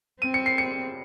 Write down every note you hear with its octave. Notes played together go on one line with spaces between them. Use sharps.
C4 D#7
C#7
C7
C#7